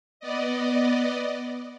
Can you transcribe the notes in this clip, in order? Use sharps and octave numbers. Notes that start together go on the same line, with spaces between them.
B3 D5 D#5